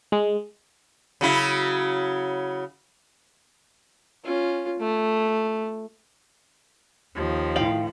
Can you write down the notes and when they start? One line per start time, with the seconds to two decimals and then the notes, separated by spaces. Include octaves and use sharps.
0.12 G#3
1.21 C#3 F#3 E4
4.24 C#4 F4
4.79 A3
7.15 D#2 D#3 F3
7.56 A2 F5 G5 F#7